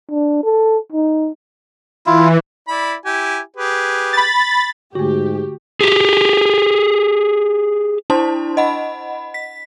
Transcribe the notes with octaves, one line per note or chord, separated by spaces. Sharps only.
D4
A4
D#4
E3 E4 F4
E4 D5 B5
E4 G4 G#5
G4 G#4 B4
B5 A6
G#2 D3 A3 F#4 G4
G4 G#4
D4 E4 C5 A5 C6
D#5 F#5 B5
B6